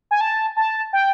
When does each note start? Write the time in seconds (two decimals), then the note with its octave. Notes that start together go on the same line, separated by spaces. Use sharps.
0.11 G#5
0.21 A5
0.57 A5
0.93 G5